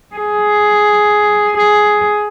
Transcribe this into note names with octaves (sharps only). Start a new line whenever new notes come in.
G#4
G#4